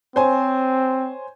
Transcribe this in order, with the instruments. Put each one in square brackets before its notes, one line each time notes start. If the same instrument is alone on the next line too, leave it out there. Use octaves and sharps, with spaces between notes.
[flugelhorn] C4 [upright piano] C5 C#5 G#5